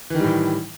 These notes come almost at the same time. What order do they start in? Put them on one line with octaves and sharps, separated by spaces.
E3 D#3 G3 A2